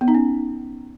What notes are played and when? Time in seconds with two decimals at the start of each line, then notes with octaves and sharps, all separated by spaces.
0.01 B3
0.08 D#4
0.15 C#4